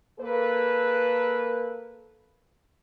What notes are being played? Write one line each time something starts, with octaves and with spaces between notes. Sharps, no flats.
A#3 A4 B4